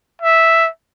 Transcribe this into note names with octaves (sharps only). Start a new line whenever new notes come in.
E5